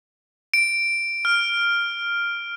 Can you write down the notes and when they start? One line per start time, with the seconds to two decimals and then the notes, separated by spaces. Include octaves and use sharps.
0.54 D7
1.25 F6